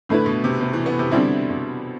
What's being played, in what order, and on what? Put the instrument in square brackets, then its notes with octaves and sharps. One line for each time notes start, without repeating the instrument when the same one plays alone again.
[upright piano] A2 [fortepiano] D3 A3 E4 B4
[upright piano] B2
C3
C3
E3
B3
C3
[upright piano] B2 [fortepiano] D3 G3 C4 E4
[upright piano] B2